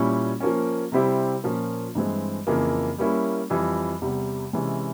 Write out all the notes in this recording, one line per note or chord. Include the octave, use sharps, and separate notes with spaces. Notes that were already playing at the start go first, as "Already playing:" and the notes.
Already playing: A#2 G3 C#4 E4
F3 A#3 C#4
C3 G3 C4 E4 G4
A#2 F3 A#3 C#4 F4
G2 E3 G#3 C4
F2 C#3 E3 A#3
G3 A#3 C#4 E4
F2 E3 G3
E2 C3 G3
C3 E3 G#3 C#4